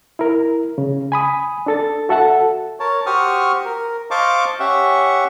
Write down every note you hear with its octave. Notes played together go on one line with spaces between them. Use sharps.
E4 A#4
C#3
G#5 B5 D#6
D4 A4 A6
F#4 A4 E5 F#5 A5
A#4 C#5 A5
F#4 G4 C5 C#6 D#6 F6
A#4
C5 D#5 F5 A5 C#6 D6
C#4 G4 E5 F#5 C#6